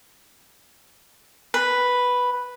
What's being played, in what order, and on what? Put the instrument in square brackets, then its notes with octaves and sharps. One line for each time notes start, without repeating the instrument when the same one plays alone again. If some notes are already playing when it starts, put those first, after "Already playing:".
[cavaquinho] B4